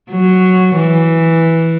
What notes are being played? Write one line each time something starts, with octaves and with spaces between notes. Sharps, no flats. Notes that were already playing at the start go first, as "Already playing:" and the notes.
F#3
E3